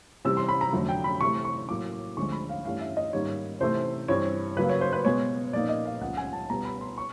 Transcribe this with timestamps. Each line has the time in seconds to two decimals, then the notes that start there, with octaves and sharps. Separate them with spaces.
0.25 C3 E3 G3 C4 E6
0.37 C6
0.49 B5
0.61 A#5
0.73 F2 D3 F#3 A3
0.89 G5
1.04 B5
1.21 C3 E3 A3 C#6
1.45 C#6
1.69 A2 F#3 A#3 D6
2.17 D2 D3 F3 G#3 C4 C#6
2.32 B5
2.49 F5
2.65 G2 E3 A3 C#4 F5
2.81 E5
2.97 D#5
3.13 G#2 D#3 G3 A#3 D#4 C#5
3.60 C3 E3 A3 C4 C5
4.08 G2 E3 G3 C4 C#5
4.57 C#3 F#3 A#3 B4
4.69 C#5
4.81 C5
4.93 B4
5.05 B2 G#3 B3 C#5
5.53 A#2 F3 A#3 D#4 D5
5.69 D#5
5.86 F5
6.01 C#2 C#3 F3 F#5
6.17 G#5
6.33 A5
6.49 B2 G3 B3 A#5
6.65 B5
6.81 C6
6.98 C#6